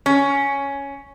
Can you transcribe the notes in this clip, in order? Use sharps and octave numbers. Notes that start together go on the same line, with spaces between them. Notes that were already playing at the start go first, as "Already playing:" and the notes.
C#4